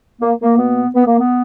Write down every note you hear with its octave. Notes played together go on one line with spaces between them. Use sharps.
A#3
A#3
B2 A#3 B3
B3
A#3
B3